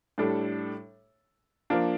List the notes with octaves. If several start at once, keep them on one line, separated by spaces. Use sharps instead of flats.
A2 G3 D4 A4
F3 A#3 D4